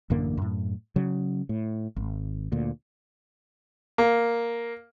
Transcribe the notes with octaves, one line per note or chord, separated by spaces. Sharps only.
A1 F#2 D3 A#3
F#2 A2
C#3 F#3
A2
G#1
D2 A#2
A#3